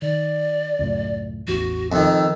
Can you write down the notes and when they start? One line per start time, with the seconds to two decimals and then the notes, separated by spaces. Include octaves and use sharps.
0.02 D#3 D5
0.79 C#2 F#2 A2
1.48 A1 E2 F#4
1.92 F2 D#3 E6